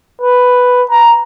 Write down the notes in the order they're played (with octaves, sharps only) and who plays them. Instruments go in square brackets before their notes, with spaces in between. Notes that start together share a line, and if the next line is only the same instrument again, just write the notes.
[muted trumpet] B4
A#5